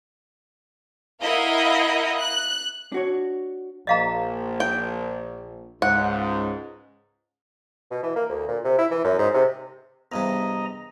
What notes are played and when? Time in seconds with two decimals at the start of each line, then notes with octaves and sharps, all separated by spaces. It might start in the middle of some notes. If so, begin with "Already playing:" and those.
1.21 E4 A#4 D#5 F5 F#5
2.17 F#6
2.92 D4 F#4 C#5
3.87 A#1 D#5 F5 A#5
4.60 G5
5.82 C#2 G#2 F#5
7.91 B2
8.03 E3
8.16 A#3
8.29 D2
8.48 A#2
8.64 C3
8.78 E4
8.91 E3
9.04 F#2
9.19 G#2
9.34 C3
10.12 E2 G2 C3 D#5 A#5